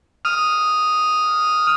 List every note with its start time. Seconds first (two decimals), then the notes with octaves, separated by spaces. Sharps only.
0.25 D#6 F6